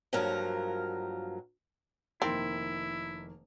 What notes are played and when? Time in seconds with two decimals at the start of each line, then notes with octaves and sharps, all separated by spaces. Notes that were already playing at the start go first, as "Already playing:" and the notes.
0.13 G2 F3 F#3 A#3 A#4
2.22 F1 D#3 A#3 C4 E4